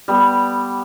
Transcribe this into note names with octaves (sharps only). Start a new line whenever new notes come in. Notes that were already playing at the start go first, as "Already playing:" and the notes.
G3 B3